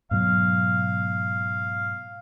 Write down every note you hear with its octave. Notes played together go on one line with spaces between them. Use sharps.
G#2 B2 F#3 F5